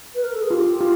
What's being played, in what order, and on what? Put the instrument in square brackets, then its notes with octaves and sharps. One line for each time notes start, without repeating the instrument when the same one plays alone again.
[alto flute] B4
A#4
A4
G#4
[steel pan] F4 [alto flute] G4
[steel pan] F4